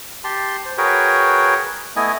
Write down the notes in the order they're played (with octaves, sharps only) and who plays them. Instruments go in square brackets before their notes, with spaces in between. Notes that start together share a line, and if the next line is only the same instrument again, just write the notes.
[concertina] G4 A5 C6
C5
F#4 G#4 A#4 B4 C#5 G5
A3 B3 E4 D#5 G#5